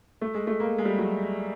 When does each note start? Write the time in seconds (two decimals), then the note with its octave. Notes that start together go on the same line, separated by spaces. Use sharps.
0.21 A3
0.34 G#3
0.47 A3
0.60 A#3
0.78 G#3
0.85 G3
0.98 F#3